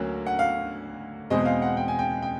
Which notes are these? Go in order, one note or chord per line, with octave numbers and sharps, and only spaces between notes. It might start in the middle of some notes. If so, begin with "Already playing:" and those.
Already playing: D2 F#3 A#3 C#4
F#5
F5
E2 B2 G#3 C4 D#5
F5
F#5
G5
G#5
G5
G5